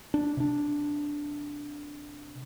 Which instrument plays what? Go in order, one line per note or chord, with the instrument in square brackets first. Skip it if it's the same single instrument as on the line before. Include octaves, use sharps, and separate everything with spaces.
[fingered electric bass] D4
C3 D4